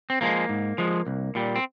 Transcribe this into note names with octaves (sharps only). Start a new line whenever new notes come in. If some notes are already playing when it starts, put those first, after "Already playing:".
C4
F3 G#3 A#3
G#2
F3 G#3
C2
A#2 G3
C4